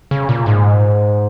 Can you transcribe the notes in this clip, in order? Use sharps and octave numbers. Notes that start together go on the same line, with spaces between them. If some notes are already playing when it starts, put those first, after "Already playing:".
C#3
A#2
G#2